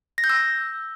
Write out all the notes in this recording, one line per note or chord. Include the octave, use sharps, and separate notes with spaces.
A#6
G6
E6